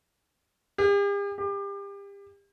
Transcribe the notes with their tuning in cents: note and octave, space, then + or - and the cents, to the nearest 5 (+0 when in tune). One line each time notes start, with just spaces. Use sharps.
G4 +45
G4 +30